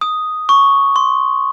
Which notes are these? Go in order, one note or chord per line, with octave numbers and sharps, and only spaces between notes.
D#6
C#6
C6